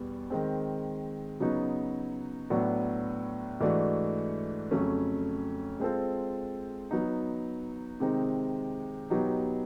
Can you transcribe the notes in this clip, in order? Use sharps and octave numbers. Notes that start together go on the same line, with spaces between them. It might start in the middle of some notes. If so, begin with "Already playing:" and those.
Already playing: E2 B2 G3 B3
D#3 G#3 C4
C#3 F#3 B3 D#4 F#4
A2 F#3 B3 D4 F#4
G#2 E3 A3 D4 F#4
F2 C#3 F#3 A3 C#4
G#3 C4 F4 A4 C5
F#3 B3 D#4
C3 D#3 G#3 C4 D#4
B2 F#3 B3 D#4 G4